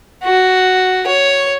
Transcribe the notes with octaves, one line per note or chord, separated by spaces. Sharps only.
F#4
C#5